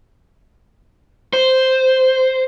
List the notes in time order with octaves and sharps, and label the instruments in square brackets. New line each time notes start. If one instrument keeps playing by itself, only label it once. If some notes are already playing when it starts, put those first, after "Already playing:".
[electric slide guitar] C5